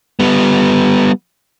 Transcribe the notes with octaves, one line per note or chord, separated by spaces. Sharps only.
G3 B3